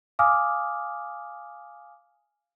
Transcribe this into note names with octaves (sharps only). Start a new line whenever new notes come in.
F5 G#5 D6 D#6 F6